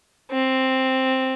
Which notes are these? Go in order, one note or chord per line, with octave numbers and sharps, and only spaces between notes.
C4